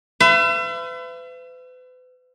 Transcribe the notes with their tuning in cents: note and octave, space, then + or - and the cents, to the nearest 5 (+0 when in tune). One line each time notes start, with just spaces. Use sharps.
B4 +40 E5 +40